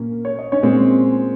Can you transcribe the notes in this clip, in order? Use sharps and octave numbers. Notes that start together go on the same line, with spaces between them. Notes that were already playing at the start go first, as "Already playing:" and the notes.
Already playing: A#2 A#3 C#4 A#4
C#5
D#5
C#4 C#5
A#2 G#3 C4